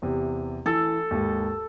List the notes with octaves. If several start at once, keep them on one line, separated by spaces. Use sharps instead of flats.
E2 C3
E3 A4
D#2 G#2